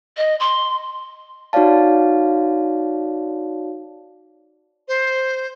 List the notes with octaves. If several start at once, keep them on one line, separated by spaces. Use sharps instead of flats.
D#5
C6
D#4 F#4 C#5 D5 F5 A5
C5